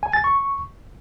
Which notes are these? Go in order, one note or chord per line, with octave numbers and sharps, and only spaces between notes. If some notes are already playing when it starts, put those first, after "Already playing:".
G#5
A6
C#6